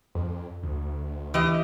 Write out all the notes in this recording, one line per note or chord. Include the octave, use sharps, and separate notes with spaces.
F2
D2
E3 G4 D#5